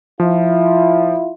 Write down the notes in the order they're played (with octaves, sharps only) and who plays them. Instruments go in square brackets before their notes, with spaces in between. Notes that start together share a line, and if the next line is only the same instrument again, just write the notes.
[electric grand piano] F3 [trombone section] E4 F4